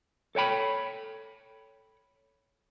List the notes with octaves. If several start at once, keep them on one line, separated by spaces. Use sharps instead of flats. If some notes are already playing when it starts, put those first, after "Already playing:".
A4 C#5 G5 B5